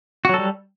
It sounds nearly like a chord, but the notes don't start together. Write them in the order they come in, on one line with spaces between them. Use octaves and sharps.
F#4 F#3 A4 G3